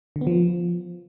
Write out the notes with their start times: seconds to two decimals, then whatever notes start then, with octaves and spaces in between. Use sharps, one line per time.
0.16 D3
0.21 B3
0.27 F3